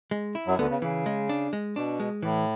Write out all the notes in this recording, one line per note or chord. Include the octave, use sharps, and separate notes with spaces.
G#3
E4
F#2 F#3
D2 D3 B3
C#3
C#3 E3
G#3
D4
G#3
B2 D4
G#3
A2 E3